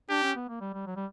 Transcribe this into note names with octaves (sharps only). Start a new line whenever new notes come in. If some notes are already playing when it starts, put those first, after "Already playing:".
D4 G4
C#4
B3
A#3
G3
G3
F#3
G3